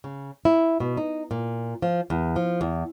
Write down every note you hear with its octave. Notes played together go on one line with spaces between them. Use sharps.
C#3
E4
B2
D#4
A#2
F3
E2
F3
E2